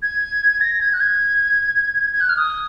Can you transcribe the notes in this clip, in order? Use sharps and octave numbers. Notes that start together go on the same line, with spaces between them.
G#6
A#6
G#6
F#6
G#6
G#6
F#6
F6
D#6